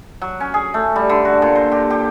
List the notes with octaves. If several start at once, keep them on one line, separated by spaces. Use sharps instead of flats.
F#3
C#4
G#4
A3
G3
D3
F#4
A#2
C5
G4
G4